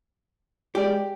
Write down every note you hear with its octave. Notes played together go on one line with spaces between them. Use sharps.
G#3 G4 D5